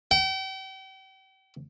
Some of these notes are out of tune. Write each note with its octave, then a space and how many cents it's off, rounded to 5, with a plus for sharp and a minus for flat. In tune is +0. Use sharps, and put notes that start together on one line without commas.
G5 -40